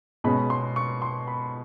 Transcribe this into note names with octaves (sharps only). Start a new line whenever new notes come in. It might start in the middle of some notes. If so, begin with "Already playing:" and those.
B2 G#3 C#4 B5
C6
C#6
C6
B5